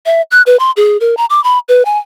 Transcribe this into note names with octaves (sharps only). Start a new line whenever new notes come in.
E5
F#6
B4
C6
G#4
A#4
A#5
D6
B5
B4
G#5